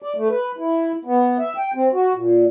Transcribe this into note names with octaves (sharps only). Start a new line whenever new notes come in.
D5
A3
B4
E4
B3
E5
G5
C4
F#4
A#2